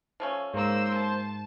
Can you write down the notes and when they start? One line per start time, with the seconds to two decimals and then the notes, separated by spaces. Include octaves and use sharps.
0.20 F3 A3 C#4
0.54 G#2 A#3 C5 E6
0.94 A5